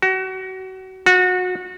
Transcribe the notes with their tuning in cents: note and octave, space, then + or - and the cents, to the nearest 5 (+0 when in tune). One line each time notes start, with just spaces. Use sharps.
F#4 +30
F#4 -25